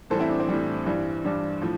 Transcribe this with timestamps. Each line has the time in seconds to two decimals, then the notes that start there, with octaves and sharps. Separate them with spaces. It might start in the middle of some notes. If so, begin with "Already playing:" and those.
0.10 A2 E3 G3 A4 C5
0.19 C4 E4
0.29 D4
0.40 C4
0.48 A2 E3 G3
0.86 G2 E3 G3
1.24 G2 E3 G3 D4
1.62 A2 F3